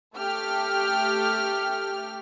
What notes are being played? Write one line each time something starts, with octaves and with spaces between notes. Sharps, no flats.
A3 G4 F6